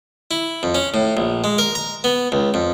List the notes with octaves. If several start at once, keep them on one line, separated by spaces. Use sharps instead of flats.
E4
F2
C#4
A2
A#1
G#3
A#4
A#5
B3
C#2
F2